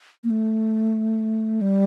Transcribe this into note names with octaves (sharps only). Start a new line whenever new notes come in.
A#3
A3
G3